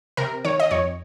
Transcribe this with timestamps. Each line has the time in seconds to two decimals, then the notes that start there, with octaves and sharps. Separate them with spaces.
0.17 C3 A#4
0.45 D#3 C#5
0.60 D#5
0.71 F2 C#5